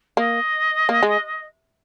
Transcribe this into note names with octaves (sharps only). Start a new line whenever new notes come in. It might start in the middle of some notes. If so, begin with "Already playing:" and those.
A#3 D#5
A#3
G#3